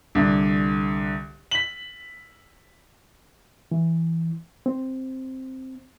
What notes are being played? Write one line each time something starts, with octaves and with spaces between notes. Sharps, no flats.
C2 D3
B6 F#7
E3
C4